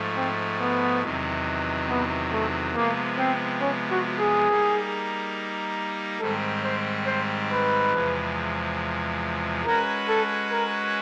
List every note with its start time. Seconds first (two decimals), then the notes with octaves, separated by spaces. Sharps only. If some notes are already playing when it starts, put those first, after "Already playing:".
Already playing: G#2 F3 A3
0.16 C4
0.60 B3
1.03 E2 C3 D#3 F#3
1.90 B3
2.33 A3
2.75 C3 F3 G#3 A#3 B3
3.18 C4
3.61 C#4
3.91 F#4
4.19 G#4
4.48 G3 A#3 D#4
6.20 G#2 D#3 G3 C4 A4
6.63 C5
7.07 C5
7.49 B4
7.92 E2 C3 F3 G#3
9.65 G#3 C#4 F#4 A#4 B4
10.09 A4
10.51 A#4